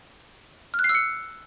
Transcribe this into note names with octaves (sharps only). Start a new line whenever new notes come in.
F6
F#6
C7
E6
C#7